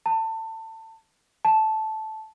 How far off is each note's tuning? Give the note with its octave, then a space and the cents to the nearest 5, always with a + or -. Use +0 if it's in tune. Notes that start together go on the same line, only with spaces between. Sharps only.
A5 +25
A5 -10